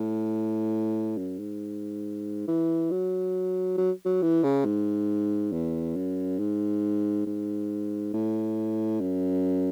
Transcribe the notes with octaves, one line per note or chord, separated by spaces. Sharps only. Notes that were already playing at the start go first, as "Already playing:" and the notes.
Already playing: A2
F#2
G#2
E3
F#3
F#3
F#3
E3
C#3
G#2
E2
F#2
G#2
G#2
A2
F#2